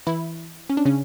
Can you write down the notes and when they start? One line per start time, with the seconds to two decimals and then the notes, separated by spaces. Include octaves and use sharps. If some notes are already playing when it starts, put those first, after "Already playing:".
0.07 E3 E4
0.69 C#4
0.77 D4
0.85 C#3 C#4